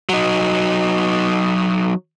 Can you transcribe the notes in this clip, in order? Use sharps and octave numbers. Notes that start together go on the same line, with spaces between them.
F#3 D#4